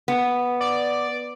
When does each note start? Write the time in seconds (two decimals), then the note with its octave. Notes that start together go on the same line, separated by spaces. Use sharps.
0.08 B3
0.60 D5